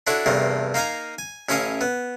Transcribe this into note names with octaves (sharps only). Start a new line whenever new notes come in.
D4 E4 F#4 A4 C#5
E2 G2 C3 A3 A#3
A#3 D#4 F5 G#5 A#5
G#5
A1 C#4 E4 C#5 D#5 F5
B3